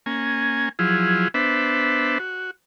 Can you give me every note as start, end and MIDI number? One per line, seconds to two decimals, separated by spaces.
0.06 0.69 58
0.06 0.69 61
0.06 0.69 80
0.79 1.28 53
0.79 1.28 54
0.79 1.28 64
0.79 1.28 65
0.79 1.28 68
1.34 2.18 59
1.34 2.18 62
1.34 2.18 71
1.34 2.18 72
1.34 2.18 76
2.19 2.51 66